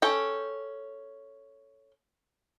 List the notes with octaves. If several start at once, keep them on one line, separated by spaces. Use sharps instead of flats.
C#4 A4 G5